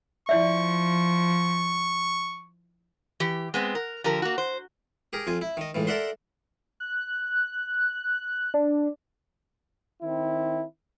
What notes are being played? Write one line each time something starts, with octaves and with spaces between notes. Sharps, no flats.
F3 E4 D5 E5 C#6
E3 G4
G#3 B3 C4
A#4
D3 F3 G4 A#4
A#3 F#4
C5
G4 G#4 A#4
F2 F4 G#5
E4
D#3 D#5
C#2 A2 E3
A4 A#4 D5 E5 F#5 C6
F#6
D4
D#3 C4 E4